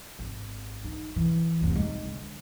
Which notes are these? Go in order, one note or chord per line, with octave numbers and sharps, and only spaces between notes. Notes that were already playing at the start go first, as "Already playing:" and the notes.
G#1
D#4
E3
F1 D2
G#3 D#4
D3